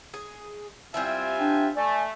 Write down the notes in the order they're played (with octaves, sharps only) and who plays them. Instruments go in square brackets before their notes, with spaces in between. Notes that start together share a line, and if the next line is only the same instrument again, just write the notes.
[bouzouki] G#4
[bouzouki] G3 C4 E4 [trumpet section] F4 E5 G#5
[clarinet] D4 [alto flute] G5
[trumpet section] A3 [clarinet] D5 [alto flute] G#5